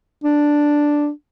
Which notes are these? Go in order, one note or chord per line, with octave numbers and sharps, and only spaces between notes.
D4